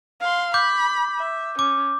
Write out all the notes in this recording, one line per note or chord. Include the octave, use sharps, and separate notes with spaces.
F5 C6
B5 D6 G6
E5
C#4 D6